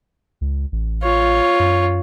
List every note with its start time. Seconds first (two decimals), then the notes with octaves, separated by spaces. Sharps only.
0.41 C#2
0.72 A1
1.03 F4 C#5
1.59 F#2